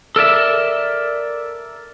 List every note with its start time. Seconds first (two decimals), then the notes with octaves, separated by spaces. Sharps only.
0.16 A4 A#4 D5 E5